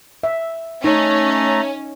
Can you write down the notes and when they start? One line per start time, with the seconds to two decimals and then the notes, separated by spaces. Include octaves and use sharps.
0.23 E5
0.84 A3 C#4 D#4 A#5